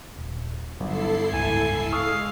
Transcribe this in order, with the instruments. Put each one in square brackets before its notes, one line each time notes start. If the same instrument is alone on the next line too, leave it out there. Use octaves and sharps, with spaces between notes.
[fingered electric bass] D#1
[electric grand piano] G1 [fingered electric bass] F#3 [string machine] E4 A4 C7
[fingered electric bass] F#1 C#2 G#2 [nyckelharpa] G#5
[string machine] G#3 [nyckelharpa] F5 [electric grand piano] C#6 D#6 E6